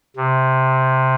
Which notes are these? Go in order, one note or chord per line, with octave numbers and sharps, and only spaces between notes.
C3